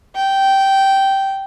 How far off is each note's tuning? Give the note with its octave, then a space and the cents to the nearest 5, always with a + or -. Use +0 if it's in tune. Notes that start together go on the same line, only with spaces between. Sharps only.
G5 -10